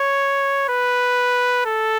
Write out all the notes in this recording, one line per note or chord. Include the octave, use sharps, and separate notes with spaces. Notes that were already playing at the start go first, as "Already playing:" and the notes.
Already playing: C#5
B4
A4